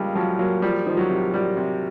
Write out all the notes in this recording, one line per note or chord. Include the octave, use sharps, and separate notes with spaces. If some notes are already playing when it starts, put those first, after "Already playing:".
Already playing: C#3 F3 G3 G#3 A#3
F3 F#3
F#3 A#3
F3 G3
D#3 F3
F#3
C3
F3 G3
C3